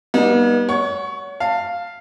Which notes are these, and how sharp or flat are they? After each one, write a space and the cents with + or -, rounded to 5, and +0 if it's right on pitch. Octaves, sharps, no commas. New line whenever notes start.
G3 +0 B3 -40 D#4 +0
C#5 +35 F#5 +0 C#6 +0
F5 +0 A5 +25